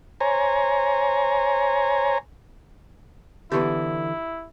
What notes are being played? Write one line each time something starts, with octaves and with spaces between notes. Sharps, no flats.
C5 C#5 G#5 A#5
D3 E3 B3 E4 G4 C#6